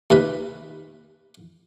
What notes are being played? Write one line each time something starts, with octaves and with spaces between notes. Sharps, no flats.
D#2 C3 B4